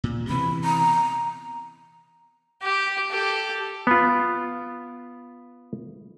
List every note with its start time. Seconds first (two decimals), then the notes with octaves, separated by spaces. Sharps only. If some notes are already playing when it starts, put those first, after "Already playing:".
0.04 A#2
0.29 C3 E3 B3 B5
0.64 A#5
2.62 G4
3.10 G4 A4
3.87 B3 F4